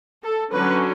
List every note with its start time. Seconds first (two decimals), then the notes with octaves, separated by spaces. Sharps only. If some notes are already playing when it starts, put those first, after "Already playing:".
0.24 A4
0.52 D3 F#3 C#4 B4